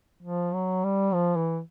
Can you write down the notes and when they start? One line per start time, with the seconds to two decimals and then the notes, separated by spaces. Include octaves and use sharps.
0.23 F3
0.54 F#3
0.84 G3
1.14 F3
1.36 E3